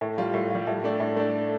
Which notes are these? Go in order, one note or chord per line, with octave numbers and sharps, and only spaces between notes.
A2
G3 F4
A2
G3 F4
A2
A3 D4
A2
A3 D4